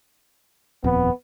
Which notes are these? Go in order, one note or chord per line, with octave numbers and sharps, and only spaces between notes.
D#1 F2 B3